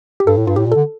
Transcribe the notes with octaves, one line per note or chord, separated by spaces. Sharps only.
G4
G2 A4
A2
G2 F4
A2 G4
A#2
D3 A4